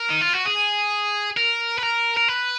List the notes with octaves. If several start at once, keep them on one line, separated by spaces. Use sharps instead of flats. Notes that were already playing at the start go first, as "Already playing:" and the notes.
Already playing: A#4
D#4
F4
F#4
G#4
A#4
B4
A#4
A#4
B4